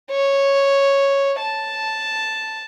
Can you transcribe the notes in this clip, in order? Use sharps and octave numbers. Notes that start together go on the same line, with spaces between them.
C#5
A5